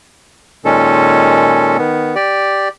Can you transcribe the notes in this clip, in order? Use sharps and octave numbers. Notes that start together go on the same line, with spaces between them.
A#2 D#3 G#3 C#4 A4
D#3 B3
G4 D5